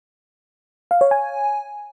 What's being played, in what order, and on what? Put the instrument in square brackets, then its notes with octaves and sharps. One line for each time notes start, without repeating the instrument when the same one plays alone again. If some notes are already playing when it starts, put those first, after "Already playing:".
[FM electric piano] F5
C#5
G#5